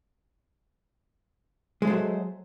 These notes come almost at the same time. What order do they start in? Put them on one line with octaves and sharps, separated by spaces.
G#3 A3 C5 F#3